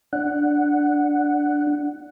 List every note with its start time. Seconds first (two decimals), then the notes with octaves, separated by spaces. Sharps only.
0.13 D4 F#5